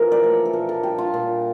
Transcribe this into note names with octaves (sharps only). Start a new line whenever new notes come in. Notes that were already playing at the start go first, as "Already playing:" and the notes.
Already playing: E3 F3 A#3 A#4
D5
A3 C#5
A4
A#2 A#4
A4
G3 G4
F4
A#2